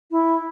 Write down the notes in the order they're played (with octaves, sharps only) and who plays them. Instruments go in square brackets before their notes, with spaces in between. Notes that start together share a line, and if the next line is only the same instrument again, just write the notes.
[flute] E4